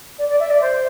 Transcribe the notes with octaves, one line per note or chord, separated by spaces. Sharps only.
D5
D5
E5
D5
C5